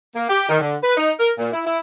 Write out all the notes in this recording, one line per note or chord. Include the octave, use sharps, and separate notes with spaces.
A#3
G4
D#3
D3
B4
D#4
A#4
A#2
E4
E4